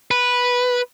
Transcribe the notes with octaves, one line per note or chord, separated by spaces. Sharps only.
B4